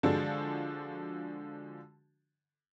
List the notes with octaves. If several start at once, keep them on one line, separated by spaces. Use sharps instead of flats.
D3 F3 G#3 D4 F#4 A4